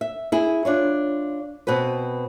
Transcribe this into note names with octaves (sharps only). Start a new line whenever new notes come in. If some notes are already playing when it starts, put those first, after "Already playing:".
E5
E4 G#4
D4 F4 C#5
B2 C4 F#4 B4